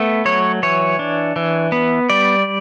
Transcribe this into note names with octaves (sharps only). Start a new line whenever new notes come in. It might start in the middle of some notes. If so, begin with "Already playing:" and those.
Already playing: A3 B3
F#3 C#5
E3 C#5
D4
E3
B3
G3 D5